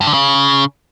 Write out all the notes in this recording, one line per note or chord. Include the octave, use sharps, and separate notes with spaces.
G2
D3
C#3